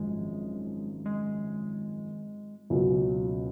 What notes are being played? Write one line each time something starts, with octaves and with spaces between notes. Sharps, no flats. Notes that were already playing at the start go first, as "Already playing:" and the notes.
Already playing: G#1 F#2 F3 G#3
G#3
C#2 B2 F#3 A#3